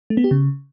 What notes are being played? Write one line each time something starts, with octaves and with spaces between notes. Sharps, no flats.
A3
B3
G4
C#3